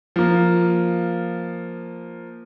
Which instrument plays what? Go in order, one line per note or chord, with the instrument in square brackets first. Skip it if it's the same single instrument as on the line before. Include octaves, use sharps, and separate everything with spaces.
[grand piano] F3 A#3